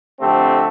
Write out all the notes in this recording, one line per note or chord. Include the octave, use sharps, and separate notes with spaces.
F2 D3 A3 C4 G4